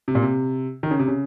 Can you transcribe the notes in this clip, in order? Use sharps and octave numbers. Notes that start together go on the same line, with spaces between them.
C3
A#2
C3
D#3
C#3
C3
C#3